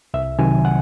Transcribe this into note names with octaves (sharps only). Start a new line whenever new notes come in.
C2 E5
C3 D#3 F#3 G#5
F#5